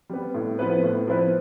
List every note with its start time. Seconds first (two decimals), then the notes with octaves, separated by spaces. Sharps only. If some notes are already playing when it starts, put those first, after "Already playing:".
0.10 G3 B3
0.34 A2
0.59 F3 B3 E4 B4
0.83 A2
1.07 F3 B3 E4 B4